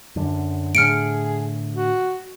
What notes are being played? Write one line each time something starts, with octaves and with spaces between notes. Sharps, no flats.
F#2 D3
A2 D3 G#4 F6 C#7 D7
F#4